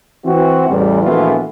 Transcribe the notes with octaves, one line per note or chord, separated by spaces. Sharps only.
E3 C4 F#4
A1 E2 G3
A#1 E3 A3 B3 F4 F#4